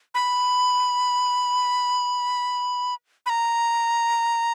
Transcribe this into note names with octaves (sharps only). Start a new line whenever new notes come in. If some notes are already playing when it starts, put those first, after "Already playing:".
B5
B5
A#5